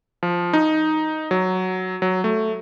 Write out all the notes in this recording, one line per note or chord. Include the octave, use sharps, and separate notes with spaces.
F3
D#4
F#3
F#3
A3